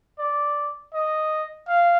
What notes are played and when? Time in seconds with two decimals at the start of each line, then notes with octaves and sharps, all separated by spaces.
0.19 D5
0.94 D#5
1.68 F5